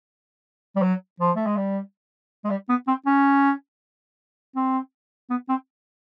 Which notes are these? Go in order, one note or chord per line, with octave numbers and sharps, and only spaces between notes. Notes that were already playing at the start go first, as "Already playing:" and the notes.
G3
F#3
F3
A3
G#3
G3
G#3
G3
B3
C4
C#4
C4
B3
C4